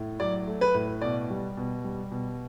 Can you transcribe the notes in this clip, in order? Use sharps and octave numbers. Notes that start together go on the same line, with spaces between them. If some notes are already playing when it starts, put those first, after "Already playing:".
Already playing: A2
F#3 D5
A3
B4
A2
B2 D5
G3
B2
G3
B2